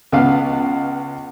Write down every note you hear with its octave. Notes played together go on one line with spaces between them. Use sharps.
C#2 B3 F5